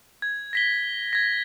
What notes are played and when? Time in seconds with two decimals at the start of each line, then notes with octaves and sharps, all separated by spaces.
0.22 G#6
0.53 A#6 B6 G7
1.13 G#6 A#6